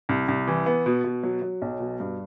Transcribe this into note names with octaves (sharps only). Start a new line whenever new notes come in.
C2
C2
E3
B3
B2
B2
F#3
F#3
B1
B2
G2